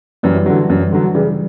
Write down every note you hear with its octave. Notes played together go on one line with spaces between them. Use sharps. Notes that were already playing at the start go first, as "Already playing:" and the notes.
F#2 E3 G3
D3 F#3
F#2
D3 F#3
F#3
C#3 E3 G3